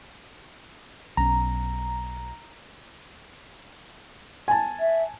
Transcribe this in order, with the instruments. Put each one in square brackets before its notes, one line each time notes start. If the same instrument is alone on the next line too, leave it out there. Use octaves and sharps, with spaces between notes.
[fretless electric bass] B1 C#4 [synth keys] A#5
[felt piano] G#5 A5
[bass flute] E5